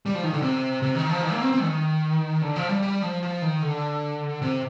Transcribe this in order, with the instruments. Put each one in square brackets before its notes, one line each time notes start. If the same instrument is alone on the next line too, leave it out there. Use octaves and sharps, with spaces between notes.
[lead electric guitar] G3
F3
D#3
D3
C3
C3
D#3
F3
D#3
A#3
C4
C4
D#3
D3
F3
G3
G3
F3
F3
D#3
D3
C3